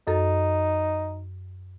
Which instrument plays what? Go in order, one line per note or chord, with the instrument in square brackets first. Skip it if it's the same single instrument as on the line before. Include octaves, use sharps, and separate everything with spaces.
[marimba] F#2 A4 [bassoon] D#4